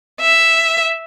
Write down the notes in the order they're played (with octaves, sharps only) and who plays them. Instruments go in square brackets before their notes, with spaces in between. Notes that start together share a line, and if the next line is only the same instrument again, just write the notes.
[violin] E5